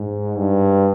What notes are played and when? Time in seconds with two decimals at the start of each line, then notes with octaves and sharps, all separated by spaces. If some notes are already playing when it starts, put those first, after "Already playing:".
Already playing: G#2
0.36 G2